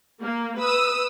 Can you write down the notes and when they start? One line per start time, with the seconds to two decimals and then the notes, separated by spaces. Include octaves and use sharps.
0.23 A#3
0.61 B4 D#6 E6